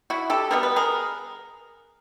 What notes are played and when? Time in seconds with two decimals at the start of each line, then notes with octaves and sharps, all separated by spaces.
0.10 E4 F#4
0.30 G4 A4
0.51 B2 G3 B3 A#4
0.63 B4
0.76 G#4 A#4